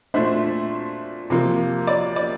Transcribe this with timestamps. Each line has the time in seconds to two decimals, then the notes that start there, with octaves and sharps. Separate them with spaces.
0.14 A#2 A3 D4 C5 E5
1.30 C3 F3 A#3
1.87 D5
2.16 D5